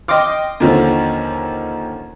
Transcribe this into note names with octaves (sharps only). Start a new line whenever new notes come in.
D#5 G5 C6 D6 F6
D#2 D3 F3 C#4